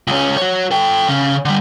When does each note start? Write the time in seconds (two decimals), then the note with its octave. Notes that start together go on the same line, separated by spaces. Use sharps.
0.07 C#2 C#4
0.37 F#4 C#5
0.71 A4 G5
1.08 C#3 C#4
1.45 D3 G3